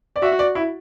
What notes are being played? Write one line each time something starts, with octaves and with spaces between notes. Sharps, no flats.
D5
F#4 E5
D5
E4